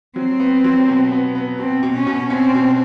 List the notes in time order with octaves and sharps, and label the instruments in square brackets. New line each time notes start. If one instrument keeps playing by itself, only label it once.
[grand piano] F#3 [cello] C4
[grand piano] B3
F#3
B2
B3
B3
[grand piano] B2 [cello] C4
[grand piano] B2
[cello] C#4
[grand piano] B2
[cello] C4 [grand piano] C#4
[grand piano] B2